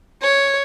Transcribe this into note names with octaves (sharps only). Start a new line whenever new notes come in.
C#5